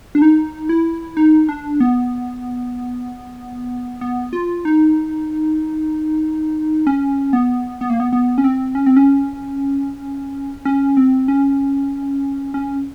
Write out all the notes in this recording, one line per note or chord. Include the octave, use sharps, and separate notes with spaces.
D4
D#4
E4
D#4
D4
B3
B3
F4
D#4
C#4
B3
B3
A#3
B3
B3
C#4
C4
C#4
C4
C#4
C#4
C4
C#4
C#4